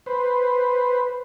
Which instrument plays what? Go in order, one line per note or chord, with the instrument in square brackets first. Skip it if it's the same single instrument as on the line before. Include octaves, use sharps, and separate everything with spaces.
[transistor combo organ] B4 C5